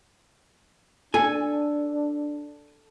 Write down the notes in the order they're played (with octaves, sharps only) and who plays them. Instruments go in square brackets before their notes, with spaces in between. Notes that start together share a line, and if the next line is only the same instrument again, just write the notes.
[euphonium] D4 [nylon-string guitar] A4 [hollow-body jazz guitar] G#5